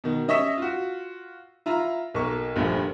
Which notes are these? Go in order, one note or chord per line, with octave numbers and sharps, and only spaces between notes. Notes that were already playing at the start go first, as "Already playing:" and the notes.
B2 D#3
C#4 D#5 E5 C#6 B6 E7
F4 F#4
E4 F4 A#5
B1 A#3 A#4 C#6
F1 A#1 G2 A#2